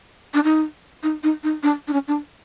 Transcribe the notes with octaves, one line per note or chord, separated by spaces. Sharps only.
D4
D#4
D#4
D#4
D#4
D4
D4
C#4
D4